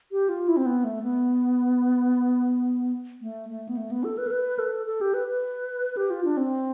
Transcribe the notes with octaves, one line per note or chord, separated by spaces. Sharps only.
G4
F4
E4
C4
B3
A3
B3
A3
A3
B3
A3
B3
A4
B4
A4
B4
A4
A4
G4
B4
B4
G4
F4
D4
C4